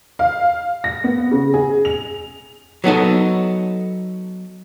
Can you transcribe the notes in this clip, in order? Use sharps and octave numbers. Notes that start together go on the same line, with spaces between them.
F5
A#6
B3
C#3
G#4
F7
F#3 B3 D#4 A4